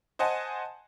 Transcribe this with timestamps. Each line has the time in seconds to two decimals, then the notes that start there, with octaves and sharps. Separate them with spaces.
0.19 C5 D#5 F#5 G#5 A5